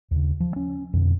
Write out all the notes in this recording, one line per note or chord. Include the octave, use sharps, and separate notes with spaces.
D#2 C#3
F3
C#4
F2 B2 D3